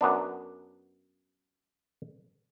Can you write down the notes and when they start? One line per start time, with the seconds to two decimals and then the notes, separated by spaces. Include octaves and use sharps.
0.01 F#2 B3 D4